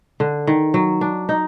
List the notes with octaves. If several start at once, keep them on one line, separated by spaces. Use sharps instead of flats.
D3
D#3
F#3
D4
D#4